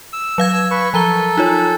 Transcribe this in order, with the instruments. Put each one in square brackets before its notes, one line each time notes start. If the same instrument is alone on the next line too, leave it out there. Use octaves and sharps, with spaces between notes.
[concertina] E6
[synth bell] F#3 F5 G#6
[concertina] B4 C#6
[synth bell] F3 A#5 G7 [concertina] A4
[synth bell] D#4 F4 C#5